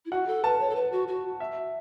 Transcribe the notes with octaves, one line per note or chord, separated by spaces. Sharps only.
E4
F#4 F#5
A4
B4 A5
C#5
A4
B4
F#4
F#4
E5